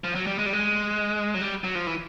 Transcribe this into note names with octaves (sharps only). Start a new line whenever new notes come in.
F3
F#3
G3
G#3
G3
G#3
F#3
G3
F#3
F3
E3